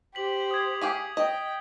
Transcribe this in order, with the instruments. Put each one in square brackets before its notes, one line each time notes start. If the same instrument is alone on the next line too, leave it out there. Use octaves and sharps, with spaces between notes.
[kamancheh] G4 C5 [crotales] B6 F#7
[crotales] D#6 G#6
[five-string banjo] G4 G#4 F5
[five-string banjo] D#5 [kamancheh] G5